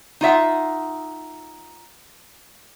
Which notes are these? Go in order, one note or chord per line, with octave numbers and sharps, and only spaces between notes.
D#4 F4 E5 F#5